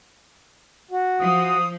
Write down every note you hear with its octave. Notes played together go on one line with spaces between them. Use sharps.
F#4
F3 D#6